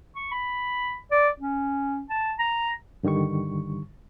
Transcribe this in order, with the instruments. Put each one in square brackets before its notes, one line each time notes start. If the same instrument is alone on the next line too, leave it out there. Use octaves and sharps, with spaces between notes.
[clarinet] C#6
B5
D5
C#4
A5
A#5
[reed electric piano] G2 D3 D#3 G3 C#6